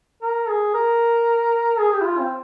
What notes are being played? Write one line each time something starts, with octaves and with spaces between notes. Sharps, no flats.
A#4
G#4
A#4
G#4
G4
E4
F4
C4